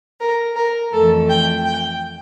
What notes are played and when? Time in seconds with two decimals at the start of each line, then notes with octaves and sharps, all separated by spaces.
0.20 A#4
0.56 A#4
0.92 F2 E3 A3 A4
1.28 G5
1.64 G5